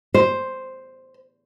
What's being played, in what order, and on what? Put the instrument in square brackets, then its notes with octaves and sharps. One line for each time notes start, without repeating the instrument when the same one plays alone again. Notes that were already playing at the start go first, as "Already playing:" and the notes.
[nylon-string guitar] C5